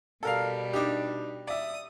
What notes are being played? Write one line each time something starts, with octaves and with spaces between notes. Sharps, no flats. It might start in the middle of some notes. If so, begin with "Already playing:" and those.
B2 G3 A4 A#4 F5
D4 D#4 G4
D5 E5 D#6